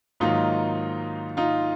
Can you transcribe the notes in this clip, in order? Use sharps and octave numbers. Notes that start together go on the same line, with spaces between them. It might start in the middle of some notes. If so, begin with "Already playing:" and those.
G#2 D#3 F#3 A#3 D#4 F4
D#4 F4